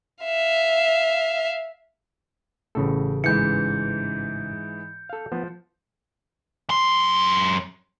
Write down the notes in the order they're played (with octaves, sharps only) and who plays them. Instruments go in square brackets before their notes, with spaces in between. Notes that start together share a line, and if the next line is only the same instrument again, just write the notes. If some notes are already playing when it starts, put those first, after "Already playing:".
[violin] E5 F5
[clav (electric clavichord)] A1 C#3 A4 [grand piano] A2
[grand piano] G#2 E3 [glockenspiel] G6 C#7
[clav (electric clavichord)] A4 F5
[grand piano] F3 [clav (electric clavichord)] B3
[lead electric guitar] F#2 C6